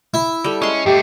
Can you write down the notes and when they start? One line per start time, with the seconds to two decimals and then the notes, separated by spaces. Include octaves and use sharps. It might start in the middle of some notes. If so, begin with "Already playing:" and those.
0.14 E4
0.44 G3 A4
0.62 G#3 C#4 C6
0.86 G2 A3 G4